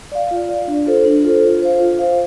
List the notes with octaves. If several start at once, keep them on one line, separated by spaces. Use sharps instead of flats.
D5 F5
F4
D5 F5
D4
F4 A4 C5
D4
F4 A4 C5
F4
C5 F5
F4
C5 F5